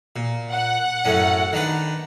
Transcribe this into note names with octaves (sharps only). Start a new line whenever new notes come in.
A#2
F#5
F#2 A2 C#4
D#3 D4 B4